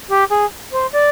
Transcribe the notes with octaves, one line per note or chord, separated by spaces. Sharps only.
G4
G#4
C5
D5